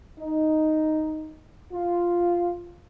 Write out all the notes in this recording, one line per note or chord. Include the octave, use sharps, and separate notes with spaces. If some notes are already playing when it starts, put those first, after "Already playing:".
D#4
F4